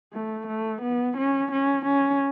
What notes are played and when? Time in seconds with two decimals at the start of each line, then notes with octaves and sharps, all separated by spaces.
0.14 A3
0.47 A3
0.82 B3
1.18 C#4
1.52 C#4
1.86 C#4